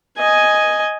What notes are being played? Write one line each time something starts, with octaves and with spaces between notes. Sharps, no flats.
D#5 G#5